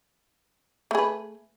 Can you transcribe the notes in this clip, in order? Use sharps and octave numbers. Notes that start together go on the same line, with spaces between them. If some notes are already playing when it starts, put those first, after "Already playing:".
A3 G#4 B4